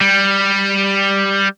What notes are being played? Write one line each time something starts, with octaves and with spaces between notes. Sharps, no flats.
G3